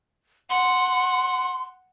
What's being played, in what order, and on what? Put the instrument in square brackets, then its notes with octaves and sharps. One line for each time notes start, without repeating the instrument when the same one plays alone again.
[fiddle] F#5 [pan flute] C6